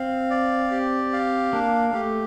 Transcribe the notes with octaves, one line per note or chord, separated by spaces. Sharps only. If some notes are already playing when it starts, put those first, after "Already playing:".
Already playing: C4 F5
D5
G4
F5
A#3 D4
A3 G4